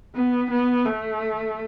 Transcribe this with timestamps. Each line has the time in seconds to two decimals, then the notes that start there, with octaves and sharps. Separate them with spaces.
0.16 B3
0.51 B3
0.85 A3